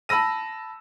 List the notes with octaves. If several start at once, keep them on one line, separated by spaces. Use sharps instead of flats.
A5 B5 E6 A#6 D#7